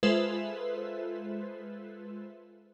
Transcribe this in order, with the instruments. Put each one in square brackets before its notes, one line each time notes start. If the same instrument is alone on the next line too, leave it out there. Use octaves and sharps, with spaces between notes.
[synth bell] G#3 F4 A4 B4 C5 E5